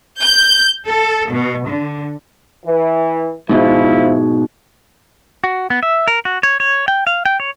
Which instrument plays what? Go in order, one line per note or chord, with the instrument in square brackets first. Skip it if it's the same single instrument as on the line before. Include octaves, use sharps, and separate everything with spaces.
[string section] G6
A4
B2
D3
[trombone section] E3
[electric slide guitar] G#2 B2 G#3 [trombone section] F3 E4
[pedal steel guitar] F#4
B3
E5
A#4
F#4
C#5
C#5
G5
F5
G5
C#5